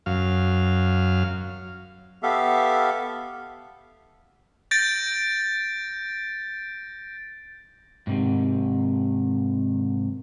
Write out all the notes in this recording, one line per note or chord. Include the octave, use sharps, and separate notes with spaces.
F#2 F5
B3 G4 A4 E5 F5
G6 A6 A#6 D7
G#2 C3 D#3